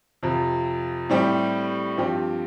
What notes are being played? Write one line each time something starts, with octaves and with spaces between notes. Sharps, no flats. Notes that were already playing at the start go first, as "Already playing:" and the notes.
F2 C3 F3
A2 G3 C4 G4
G2 F3 C4 G4